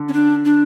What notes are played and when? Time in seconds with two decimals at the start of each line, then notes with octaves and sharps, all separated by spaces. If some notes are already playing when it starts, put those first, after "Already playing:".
Already playing: D3
0.08 C#4
0.13 D4
0.45 D4